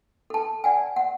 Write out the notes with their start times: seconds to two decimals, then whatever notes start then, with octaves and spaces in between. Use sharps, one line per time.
0.30 A4 A5
0.64 D5 F#5 G#5
0.96 F#5